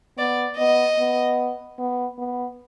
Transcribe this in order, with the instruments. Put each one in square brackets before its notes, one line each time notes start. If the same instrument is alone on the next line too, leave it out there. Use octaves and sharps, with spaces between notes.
[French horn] B3 [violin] D5
[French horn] B3 [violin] D#5
[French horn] B3
B3
B3